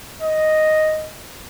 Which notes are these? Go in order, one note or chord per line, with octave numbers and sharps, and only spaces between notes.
D#5